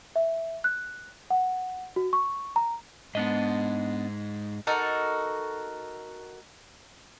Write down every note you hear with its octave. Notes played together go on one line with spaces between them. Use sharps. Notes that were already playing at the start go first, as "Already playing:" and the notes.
E5
F#6
F#5
F#4
C#6
A#5
G#2 B3 D4 D#5
D#4 F#4 A4 A#4